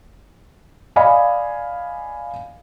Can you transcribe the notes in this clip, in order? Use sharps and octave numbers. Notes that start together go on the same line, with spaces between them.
D5 D#5 F5 G#5 B5